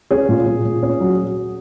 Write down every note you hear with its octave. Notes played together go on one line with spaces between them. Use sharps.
C#4 G#4
A#2
A#2
A#2
C#4
F#3